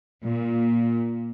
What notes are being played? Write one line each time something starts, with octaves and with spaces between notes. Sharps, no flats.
A#2